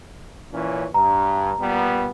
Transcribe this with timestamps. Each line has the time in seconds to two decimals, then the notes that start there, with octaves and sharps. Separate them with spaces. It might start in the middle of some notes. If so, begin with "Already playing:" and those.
0.53 A#2 E3 C#4
0.94 G2 A#5
1.60 A#2 G3 B3